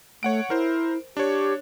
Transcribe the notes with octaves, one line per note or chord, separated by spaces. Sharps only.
A3 C#5 F#5 D7
E4 A#4 C5
D4 G4 C#5